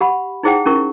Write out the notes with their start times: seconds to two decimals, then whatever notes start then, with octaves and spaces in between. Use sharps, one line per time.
0.01 G4 F#5 B5
0.43 D#4 E4 G#4 C5 F#5 G5
0.66 C#4 E4 A#4 C#6